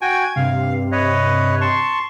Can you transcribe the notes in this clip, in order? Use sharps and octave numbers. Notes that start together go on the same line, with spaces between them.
F#4 G5 G#5 G#6
G2 C3 F5
B4 C#5 D#5
A5 C6 C#6